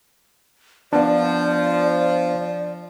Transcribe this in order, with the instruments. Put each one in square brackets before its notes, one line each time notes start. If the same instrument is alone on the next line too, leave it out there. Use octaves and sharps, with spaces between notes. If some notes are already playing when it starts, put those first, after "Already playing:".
[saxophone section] F3 [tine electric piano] B3 D4 [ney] D5